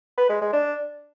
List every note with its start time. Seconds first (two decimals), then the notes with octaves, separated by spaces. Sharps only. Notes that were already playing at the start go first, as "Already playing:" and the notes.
0.18 B4
0.29 G#3
0.41 G#3
0.53 D4